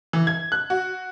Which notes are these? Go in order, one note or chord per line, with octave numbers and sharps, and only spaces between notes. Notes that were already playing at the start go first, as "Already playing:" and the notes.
E3
G#6
F#6
F#4